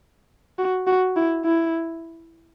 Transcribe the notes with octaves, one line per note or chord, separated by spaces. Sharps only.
F#4
F#4
E4
E4